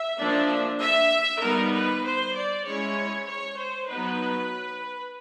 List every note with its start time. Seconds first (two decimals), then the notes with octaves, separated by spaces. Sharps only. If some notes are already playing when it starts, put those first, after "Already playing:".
Already playing: E5
0.19 F3 A#3 D4
0.80 E5
1.42 D#3 G3 B3 D#4 A#4
1.73 B4
2.04 C5
2.35 D5
2.65 G#3 C#4 E4 C#5
3.27 C#5
3.58 C5
3.89 F#3 B3 D#4 B4